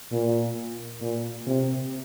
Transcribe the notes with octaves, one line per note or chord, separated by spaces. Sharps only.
A#2
A#2
C3